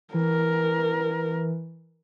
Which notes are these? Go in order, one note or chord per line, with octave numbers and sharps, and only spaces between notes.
E3 A#4